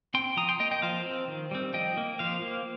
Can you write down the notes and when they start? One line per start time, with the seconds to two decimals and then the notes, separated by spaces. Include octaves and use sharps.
0.14 C4 G5 C6
0.37 F3 A#5 D#6
0.49 G5 C6
0.59 A#3 D#5 G5
0.71 D#5 G5
0.82 F3 C5 F5
1.06 C4
1.28 D#3
1.51 G3 C4
1.74 F3 D#5 G5
1.97 A#3
2.19 F3 C5 F5
2.42 A#3